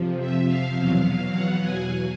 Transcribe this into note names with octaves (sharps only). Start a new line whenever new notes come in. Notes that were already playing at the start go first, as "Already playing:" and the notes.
Already playing: F2 C3 F3
E5
F5
E2 B2 F#3
F#5
G#5